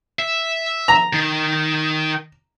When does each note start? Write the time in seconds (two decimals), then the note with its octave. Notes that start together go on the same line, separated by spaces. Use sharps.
0.19 E5
0.88 A#5
1.13 D#3